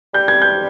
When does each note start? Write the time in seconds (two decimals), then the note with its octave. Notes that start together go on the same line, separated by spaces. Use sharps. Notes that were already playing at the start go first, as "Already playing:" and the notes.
0.14 G3 G6
0.28 G#6
0.42 G6